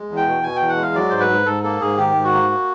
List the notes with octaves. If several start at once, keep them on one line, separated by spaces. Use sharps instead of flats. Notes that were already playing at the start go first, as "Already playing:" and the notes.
Already playing: G#3
E2
G5
B2
B2 G#5
E2 G5
F#5
G#3
F5
F#3 D5
G#2 C5
B4
G#2
G#2 A4
A#3 A4
G#2 G#4
D#3 G4
G#2
F#4
A#3
A#3